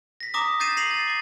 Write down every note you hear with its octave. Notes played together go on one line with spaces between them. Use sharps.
A#6 B6
A#5 D6 D#6 A#6
G6 A6 C7 D#7 E7
A#6 C7 D#7 F7 F#7
A6
D6 A6